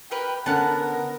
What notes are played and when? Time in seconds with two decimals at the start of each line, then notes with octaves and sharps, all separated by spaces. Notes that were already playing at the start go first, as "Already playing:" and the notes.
0.11 G4 A#4 B4 G5
0.46 D3 B3 C#4 A#4 F#5 A5